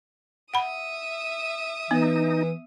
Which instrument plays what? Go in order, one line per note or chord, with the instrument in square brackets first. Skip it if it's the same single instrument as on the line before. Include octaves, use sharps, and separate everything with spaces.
[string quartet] E5 D#6 [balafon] F#5 B5
[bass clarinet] E3 [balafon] B3 [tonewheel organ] D#4